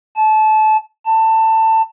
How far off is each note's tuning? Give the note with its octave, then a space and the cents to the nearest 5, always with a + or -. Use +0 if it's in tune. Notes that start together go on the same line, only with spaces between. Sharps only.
A5 -25
A5 +20